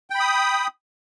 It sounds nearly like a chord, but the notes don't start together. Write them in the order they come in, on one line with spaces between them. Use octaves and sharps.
G5 B5 D#6